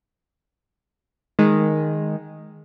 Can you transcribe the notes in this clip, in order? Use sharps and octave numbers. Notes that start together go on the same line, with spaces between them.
D#3 G#3